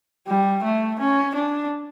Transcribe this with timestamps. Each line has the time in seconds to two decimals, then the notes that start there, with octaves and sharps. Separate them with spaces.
0.28 G3
0.64 A3
0.99 C#4
1.35 D4